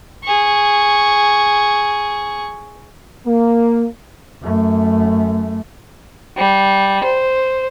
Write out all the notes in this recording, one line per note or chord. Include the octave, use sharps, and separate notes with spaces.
G#4 C#6
A#3
F#2 A3
G3
C5